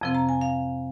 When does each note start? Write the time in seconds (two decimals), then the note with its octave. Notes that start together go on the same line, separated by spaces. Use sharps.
0.01 F2 C3 F3 C4
0.15 A#5
0.29 G#5
0.41 F5